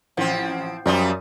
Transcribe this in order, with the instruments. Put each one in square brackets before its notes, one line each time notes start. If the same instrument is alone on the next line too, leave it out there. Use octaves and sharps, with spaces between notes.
[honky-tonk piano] A1 [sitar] F3 C4
[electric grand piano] F#2 [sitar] F3 G3 F4 [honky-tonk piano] D5 A#5 D#6